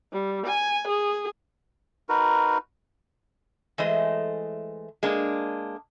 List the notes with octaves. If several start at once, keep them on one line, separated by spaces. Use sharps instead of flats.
G3
G#5
G#4
D#4 F#4 A#4 B4
E3 G#3 A3 C5 D#5
G#3 A#3 D4